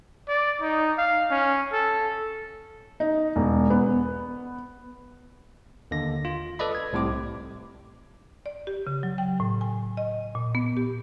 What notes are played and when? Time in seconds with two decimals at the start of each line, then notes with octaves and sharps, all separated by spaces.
0.28 D5
0.62 D#4
0.98 F5
1.31 C#4
1.73 A4
3.00 D#4
3.36 E1
3.70 B3
5.91 D#2 D3 A#6
6.25 F4
6.59 A4 B4 D5 D#5 B5
6.75 G#6
6.93 C2 A2 C3 D6
8.46 D5
8.67 G4
8.87 C#3
9.03 F#3
9.18 G5
9.40 A2
9.61 G#5
9.97 D#5
10.35 A#2
10.55 B3
10.77 G4